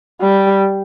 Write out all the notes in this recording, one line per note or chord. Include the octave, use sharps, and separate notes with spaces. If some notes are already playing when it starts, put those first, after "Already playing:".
G3